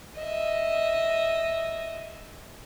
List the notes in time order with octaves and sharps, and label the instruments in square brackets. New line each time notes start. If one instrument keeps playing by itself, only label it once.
[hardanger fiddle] D#5 E5